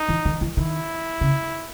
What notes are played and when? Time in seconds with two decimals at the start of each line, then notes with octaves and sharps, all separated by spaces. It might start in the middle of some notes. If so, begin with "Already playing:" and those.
Already playing: D#4
0.09 E3
0.25 D#3
0.41 E3
0.57 D#3 E4
1.21 C#3